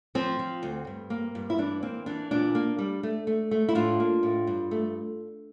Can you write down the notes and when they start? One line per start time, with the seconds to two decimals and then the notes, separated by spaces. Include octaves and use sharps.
0.15 F3 C4
0.39 F3
0.63 D2
0.87 G2
1.10 A#3
1.35 G2
1.50 E4
1.58 E3 D4
1.82 A#3 C4
2.06 E3 D4
2.31 A#2 D4
2.55 A#3
2.79 G3
3.03 A3
3.27 A3
3.51 A3
3.69 E4
3.75 A2 D4 F4
4.00 A#3
4.23 A2
4.47 G2
4.71 A3